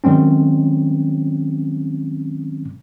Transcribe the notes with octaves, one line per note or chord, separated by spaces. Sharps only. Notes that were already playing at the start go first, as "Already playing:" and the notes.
D#3 F#3 G#3 C4 C#4